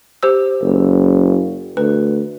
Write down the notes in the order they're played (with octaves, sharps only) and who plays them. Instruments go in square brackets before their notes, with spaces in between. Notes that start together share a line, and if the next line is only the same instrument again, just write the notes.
[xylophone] G4 C5 E6
[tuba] F#1
[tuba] D2 [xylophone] B4